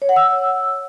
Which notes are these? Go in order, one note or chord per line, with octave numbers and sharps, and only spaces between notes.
C#5
F#5
E6